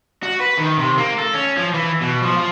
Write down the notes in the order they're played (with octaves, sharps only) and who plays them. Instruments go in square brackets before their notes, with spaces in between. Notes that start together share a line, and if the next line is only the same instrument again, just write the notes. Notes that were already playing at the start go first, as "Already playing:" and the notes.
[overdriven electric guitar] F#4
B4
D#3
C3
A#3
A4
C#4
F3
E3
B2
F3
F3